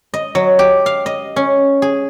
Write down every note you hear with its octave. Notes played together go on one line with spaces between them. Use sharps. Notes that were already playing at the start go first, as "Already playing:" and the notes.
D#5
F#3
G4
F5
D#5
C#4
G#4